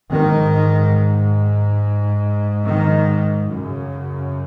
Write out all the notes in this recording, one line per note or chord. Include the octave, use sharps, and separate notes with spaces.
G#2 D#3
D#3
F#2 C#3